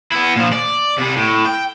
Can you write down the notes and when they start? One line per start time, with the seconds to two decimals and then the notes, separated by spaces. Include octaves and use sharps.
0.12 B3 E4
0.36 A#2 F3
0.53 D5
0.98 C3 G3
1.16 A2
1.46 G5